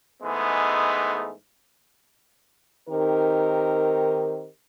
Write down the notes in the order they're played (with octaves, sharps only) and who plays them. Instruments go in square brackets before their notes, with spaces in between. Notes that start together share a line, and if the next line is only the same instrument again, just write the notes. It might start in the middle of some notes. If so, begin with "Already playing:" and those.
[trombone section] G#2 E3 G#3 A3 B3 D#4
[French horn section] D#3 C4 D#4 G4 A#4